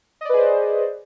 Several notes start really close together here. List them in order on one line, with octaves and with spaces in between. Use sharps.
D#5 D5 B4 G#4 C5